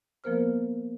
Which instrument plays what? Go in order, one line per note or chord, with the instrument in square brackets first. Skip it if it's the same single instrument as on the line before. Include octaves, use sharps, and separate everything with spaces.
[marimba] F3 A#3 B3 A#4 C5 F6